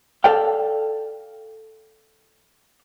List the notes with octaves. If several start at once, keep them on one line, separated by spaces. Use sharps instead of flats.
A4 D5 F5 G5